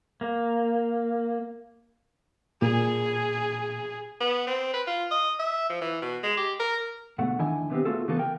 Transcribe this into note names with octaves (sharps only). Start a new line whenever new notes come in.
A#3
A#2 G#4
B3
C4
B4
F4
D#5
E5
F3
E3
B2
G#3
G4
A#4
D2 G#2 B2 A3 F#5
E2 D3 D#3 E4 D#5 G#5
C3 B3 C4 G4
A3 B3 F4 F#4 G#4 A4
C#3 E3 A#3 B3 C#4 A4
A#4 G5